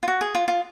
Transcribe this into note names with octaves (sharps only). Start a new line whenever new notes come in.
F4
F#4
G#4
F4
F4